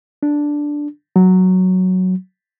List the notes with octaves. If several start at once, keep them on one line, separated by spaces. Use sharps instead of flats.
D4
F#3